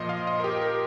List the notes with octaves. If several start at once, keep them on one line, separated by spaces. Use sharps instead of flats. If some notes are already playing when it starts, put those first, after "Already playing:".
Already playing: A#2 F3 D#5 C6
F5
D#5
A#4
G4
A#4